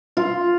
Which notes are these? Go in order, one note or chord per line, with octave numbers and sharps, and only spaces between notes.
F4